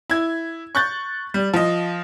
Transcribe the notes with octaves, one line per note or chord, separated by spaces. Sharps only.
E4 G#6
C#6 F#6 G6 A6
G3
F3 D#5